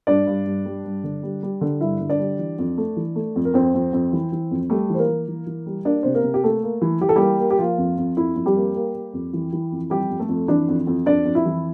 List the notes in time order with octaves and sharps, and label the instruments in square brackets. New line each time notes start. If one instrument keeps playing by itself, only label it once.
[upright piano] G2 D4 D5
G2
G2
G3
G2
D3
G3
G3
D3
G2 E4 E5
D3
D4 D5
G3
E3
F2
A3
E3
A3
F2
A#4
F2 C4 C5
F2
F2
E3
E3
F2
G3 A3 A4
E3 C5
A#3 A#4
E3
E3
E3
G3
A#3 D4 D5
C3 C5
A#3 A#4
C3
G4
A3 A#3 A4
A#3
E3
E3 G4
A4
G3 A#3 G4
A#3
G4
F3 A#3 F4
F2
F2
F2 E4
F2
G3 G4
A#3
A#3
A#3
F2
E3
E3
F2
F2 G3 G4
F2
A3 A4
F2
E3 D4 D5
F2
F2
F2 D4 D5
F2
E4 E5
E3